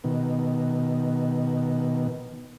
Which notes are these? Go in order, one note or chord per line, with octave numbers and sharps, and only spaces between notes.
B2 D#3